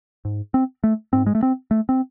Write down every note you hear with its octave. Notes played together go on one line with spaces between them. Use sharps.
G#2
C4
A3
G#2 C4
G#3
A3
C4
A3
C4